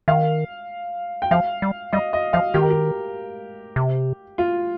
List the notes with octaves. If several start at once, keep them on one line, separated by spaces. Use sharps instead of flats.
D#3 F5
G5
F3 F5
G3
G3 D#5
D#5
F3 F5
D#3 G4
A#4
G4
C3
F4